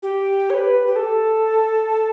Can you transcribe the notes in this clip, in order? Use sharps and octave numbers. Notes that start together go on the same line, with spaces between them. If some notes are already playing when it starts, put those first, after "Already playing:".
G4
C#5
B4
G4
A4